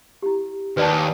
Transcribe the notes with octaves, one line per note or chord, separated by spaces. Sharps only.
E4 G4
D#2 B4 D5 A5
G#5